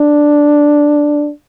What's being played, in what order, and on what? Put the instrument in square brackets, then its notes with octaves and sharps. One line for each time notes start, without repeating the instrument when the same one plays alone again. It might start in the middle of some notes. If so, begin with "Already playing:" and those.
Already playing: [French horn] D4